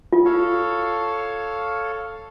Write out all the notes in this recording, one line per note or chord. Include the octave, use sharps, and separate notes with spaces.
F4
A4 C#5 F5